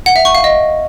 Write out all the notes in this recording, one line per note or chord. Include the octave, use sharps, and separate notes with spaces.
F#5
E5
C#6
F5
D#5